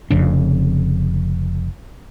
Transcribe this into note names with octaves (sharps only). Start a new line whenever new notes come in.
F1 F2 C#3 D4